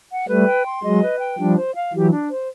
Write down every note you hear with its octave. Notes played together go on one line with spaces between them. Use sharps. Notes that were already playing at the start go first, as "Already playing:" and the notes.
F#5
G3 A3 B4
G5
C6
F#3 G#3 D#5
B4
G5
F3 G3 D4
C5
F5
E3 F#3 G4
D4
C5